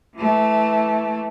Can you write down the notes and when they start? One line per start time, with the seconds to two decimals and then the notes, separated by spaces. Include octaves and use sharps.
0.16 E3 A3